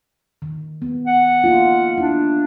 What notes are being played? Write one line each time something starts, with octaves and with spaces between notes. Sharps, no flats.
D#3
B3
F#5
A#3 D#4 F4
D4 E4